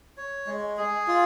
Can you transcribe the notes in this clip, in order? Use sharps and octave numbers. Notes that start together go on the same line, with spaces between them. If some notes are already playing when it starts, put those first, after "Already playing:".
C#5
G#3
G#4
F4